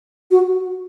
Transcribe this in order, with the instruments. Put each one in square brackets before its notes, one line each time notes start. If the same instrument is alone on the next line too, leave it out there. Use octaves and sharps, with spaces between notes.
[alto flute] F#4